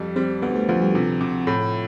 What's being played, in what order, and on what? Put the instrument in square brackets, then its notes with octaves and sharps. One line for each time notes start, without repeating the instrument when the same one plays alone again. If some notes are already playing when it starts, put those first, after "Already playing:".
Already playing: [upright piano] F2 G3
[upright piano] G3 [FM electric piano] C4 C5
[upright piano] D2 [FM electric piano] B3 B4
[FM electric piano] A3 A4
[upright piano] D2 [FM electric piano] F3 F4
[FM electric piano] G3 G4
[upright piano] C3 [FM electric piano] F3 F4
[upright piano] C3
A2